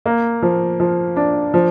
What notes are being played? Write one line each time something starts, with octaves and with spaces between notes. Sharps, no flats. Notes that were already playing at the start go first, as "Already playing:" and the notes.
A#3
F3
F3
D4
F3